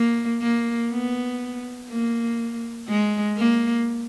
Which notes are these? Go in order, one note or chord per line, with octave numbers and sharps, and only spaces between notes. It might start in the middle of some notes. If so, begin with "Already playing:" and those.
Already playing: A#3
A#3
B3
A#3
G#3
A#3